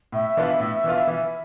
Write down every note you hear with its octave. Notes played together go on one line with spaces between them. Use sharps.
A2 E5
E3 B3 D4 F4
A2
E3 B3 D4 F4
E3